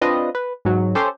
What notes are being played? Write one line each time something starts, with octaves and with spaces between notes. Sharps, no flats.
C4 D4 F4 B4 D#5
B4
G#2 F#3
C#4 G4 A4 C5